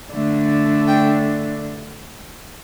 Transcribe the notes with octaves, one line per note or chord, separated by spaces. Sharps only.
D3 A3 D4
G5